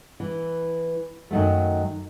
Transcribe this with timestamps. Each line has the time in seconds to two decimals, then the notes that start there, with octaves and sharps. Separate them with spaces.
0.20 E3
1.31 F#2 D#3 F#3 A3